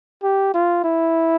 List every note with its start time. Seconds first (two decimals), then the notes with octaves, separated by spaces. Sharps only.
0.23 G4
0.54 F4
0.84 E4